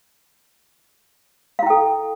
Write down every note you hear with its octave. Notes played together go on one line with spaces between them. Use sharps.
E4 A4 F5 G5